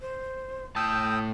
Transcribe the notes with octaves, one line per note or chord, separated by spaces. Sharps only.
C5
A2 G5 A5 D#6 E6 G6